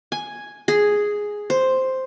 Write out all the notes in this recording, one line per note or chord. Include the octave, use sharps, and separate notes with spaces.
G#5
G#4
C5